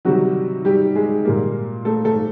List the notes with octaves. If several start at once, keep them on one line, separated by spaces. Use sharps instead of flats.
C3 D#3 F#3 G3 F#4
G3 G4
G#3 G#4
A#2 G3 A#3
A3 A4
A3 A4